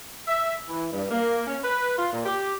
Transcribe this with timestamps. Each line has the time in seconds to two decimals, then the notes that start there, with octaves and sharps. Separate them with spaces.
0.28 E5
0.68 E3
0.93 G2
1.11 A#3
1.47 C#4
1.64 B4
1.98 F4
2.13 A#2
2.26 G4